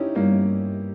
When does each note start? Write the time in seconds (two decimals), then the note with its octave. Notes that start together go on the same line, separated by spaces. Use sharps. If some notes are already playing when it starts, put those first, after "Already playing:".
Already playing: C#4 D#4 E4 G4
0.15 G2 G3 A#3 B3 C#4